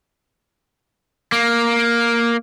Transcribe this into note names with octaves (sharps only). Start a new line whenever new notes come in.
A#3